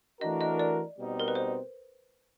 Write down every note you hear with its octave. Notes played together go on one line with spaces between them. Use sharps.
E3 A3 D4 F#4 A#4 D#5
D#5
D5
B2 G3 C4 D#4
A#4
B4
C5